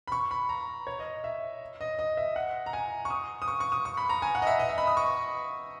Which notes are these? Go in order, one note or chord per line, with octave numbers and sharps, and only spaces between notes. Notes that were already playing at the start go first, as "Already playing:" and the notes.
B5
C#6
B5
A#5
C#5
D#5
E5
D#5
D#5
E5
F#5
A#5
G#5
C#6
D#6
D#6
C#6
C#6
D#6
C#6
B5
A#5
G#5
F#5
D#5
E5
D#5
E5
B5
D#6
C#6